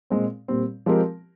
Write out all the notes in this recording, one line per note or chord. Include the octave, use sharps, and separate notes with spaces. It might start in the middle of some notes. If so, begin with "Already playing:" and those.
A#2 G#3 C4
A#2 G3 C4
F3 G#3 C4 G4 A#4